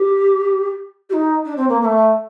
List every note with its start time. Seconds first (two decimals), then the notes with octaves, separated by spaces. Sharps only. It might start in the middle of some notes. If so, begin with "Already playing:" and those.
Already playing: G4
1.09 G4
1.13 D#4
1.45 D4
1.57 C4
1.69 A#3
1.81 A#3
1.85 A3